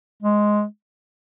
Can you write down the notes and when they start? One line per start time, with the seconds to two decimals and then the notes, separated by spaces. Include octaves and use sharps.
0.22 G#3